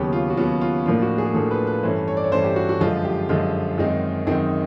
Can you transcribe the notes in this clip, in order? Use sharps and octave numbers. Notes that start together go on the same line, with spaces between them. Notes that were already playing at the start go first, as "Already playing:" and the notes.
Already playing: D#2 C#3 F#3 B3 G4
F4
F#4
D#2 C#3 F#3 B3 F4
F4
A2 F3 A#3 D4 F4
F#4
G#4
A2 F3 A#3 D4 A4
B4
B4
G2 E3 A3 C#4 C5
C#5
D5
C#5
G2 E3 A3 C#4 C5
G4
F#4
F#4
F#2 D3 F3 G#3 F4
G4
F#2 D3 F3 G#3 F4
F#2 D#3 G#3 C4 D#4
F#2 D#3 G#3 C4 D#4